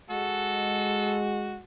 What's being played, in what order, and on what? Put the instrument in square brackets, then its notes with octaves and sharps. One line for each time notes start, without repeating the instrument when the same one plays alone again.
[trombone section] G#3 [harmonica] F#4 [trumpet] A4